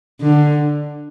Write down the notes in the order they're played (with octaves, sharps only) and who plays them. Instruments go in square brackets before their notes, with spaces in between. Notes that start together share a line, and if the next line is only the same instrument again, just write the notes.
[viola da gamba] D3